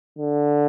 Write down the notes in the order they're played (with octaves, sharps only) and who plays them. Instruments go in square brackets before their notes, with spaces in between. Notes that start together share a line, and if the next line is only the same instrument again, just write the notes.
[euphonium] D3